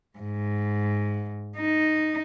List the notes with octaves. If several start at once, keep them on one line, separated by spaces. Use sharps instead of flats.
G#2
D#4